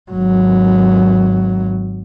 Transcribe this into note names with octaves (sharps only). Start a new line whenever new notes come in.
G#1 F#3